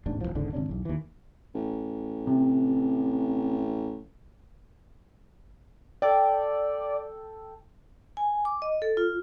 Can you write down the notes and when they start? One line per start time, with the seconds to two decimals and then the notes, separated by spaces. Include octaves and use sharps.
0.06 E1 A1 G#2 D4
0.21 E1 E2 E3 F3
0.35 E1 C#2 G#2 D3
0.53 G#1 C3 C#4 D4
0.69 B1 E2
0.85 D#2 E3
1.55 A1
2.27 C3
6.02 A4 D5 G5
8.17 G#5
8.45 D6
8.62 D#5
8.82 A4
8.97 F4